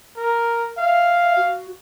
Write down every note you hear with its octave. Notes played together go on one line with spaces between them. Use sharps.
A#4
E5 F5
F#4